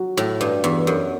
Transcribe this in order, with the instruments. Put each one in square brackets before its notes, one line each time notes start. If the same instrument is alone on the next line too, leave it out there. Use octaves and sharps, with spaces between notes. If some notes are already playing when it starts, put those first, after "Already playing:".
Already playing: [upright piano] F#3 F#4
[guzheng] A2 [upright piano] F#3
[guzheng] G2 [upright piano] D4
[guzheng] E2 [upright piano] B3
[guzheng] F#2 [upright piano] F#4